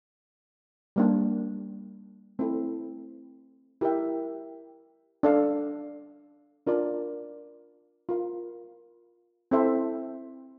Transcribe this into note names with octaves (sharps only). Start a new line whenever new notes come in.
G3 A#3 D4
A3 C4 E4 A4
E4 G4 A#4 E5 G5
D4 A4 D5 F5
D4 F4 A#4 D5
F4 A#4 F5
C4 E4 A4 C5 E5